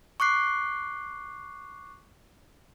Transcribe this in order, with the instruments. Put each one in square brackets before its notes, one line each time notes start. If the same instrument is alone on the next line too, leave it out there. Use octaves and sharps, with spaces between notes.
[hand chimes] C#6 D6 F#6 C7